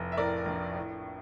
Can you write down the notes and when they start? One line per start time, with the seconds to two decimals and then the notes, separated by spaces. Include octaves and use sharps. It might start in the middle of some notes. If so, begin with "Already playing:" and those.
Already playing: F1
0.12 E5
0.17 A2 A#4 D5
0.46 A#1
0.75 A2